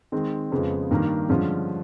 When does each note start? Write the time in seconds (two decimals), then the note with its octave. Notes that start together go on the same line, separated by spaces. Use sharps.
0.12 D#3 G#3 C4
0.52 F2 C#3 F3 G#3 B3
0.91 G2 D#3 G3 A#3
1.29 G2 D3 F3 G#3 C#4